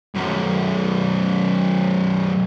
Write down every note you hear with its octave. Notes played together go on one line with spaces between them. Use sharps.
B1 F#2